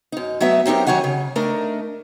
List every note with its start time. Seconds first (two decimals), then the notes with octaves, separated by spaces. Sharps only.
0.12 F#2 D#4
0.41 F#3 A3 B3 E5
0.66 F#3 C4 D#4 G4 A#4
0.87 D#3 F#3 C#5 F#5 G#5
1.04 C#3
1.36 A3 D4 D#4 A#4